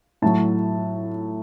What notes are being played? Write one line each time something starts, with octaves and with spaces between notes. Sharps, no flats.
A2 F#3 A5